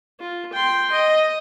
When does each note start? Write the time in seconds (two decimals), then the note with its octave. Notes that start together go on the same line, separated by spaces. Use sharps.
0.20 F4
0.53 G5 C6
0.92 D#5